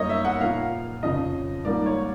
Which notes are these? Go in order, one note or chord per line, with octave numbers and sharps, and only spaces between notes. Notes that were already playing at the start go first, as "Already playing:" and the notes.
Already playing: F#2 D#3 G3 A#3 C#5 D#5
E5
F#5
A#2 F3 A#3 F5
F2 C#3 F3 D#5
G#2 D#3 G3 A#3 D5
C#5